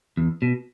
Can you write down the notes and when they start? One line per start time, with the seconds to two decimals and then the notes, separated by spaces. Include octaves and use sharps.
0.17 E2
0.42 B2